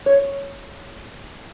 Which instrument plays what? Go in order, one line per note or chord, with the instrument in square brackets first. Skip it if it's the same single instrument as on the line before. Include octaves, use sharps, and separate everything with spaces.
[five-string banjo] C#5